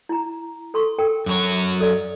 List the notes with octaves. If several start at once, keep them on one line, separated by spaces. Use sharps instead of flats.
E4 A#5
A4 C6 C#6
A4 A#4 G5
F#2 F#3 C#5
A4 D5 E5